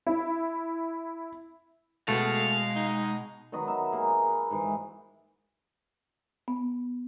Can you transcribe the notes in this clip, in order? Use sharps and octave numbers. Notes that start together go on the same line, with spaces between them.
E4
B2 G#3 A3 F5
D#4
D#3 F#3 B3 D#5
E5
A#3 G#4
B4
G#2 E3
B3